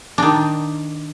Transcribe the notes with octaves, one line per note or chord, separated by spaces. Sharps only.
D#3 D4